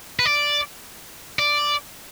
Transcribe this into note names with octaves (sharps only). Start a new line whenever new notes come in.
B4
D5
D5